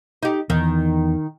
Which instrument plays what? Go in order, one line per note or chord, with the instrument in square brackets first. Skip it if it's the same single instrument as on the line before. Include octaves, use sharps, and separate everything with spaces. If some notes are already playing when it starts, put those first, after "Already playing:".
[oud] D#4 G4
[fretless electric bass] E2 [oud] D#3